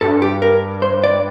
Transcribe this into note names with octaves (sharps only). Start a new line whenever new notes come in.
G2 A4
G4
A#4
C5
D5